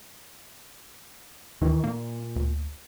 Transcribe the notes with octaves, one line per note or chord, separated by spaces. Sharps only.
D#2 D#3 E3
A#2 A#3
D2